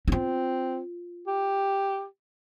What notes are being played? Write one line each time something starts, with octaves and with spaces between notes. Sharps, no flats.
C4 D#4 F4
G4